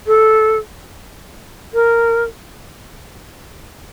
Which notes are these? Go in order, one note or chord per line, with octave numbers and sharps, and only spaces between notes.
A4
A#4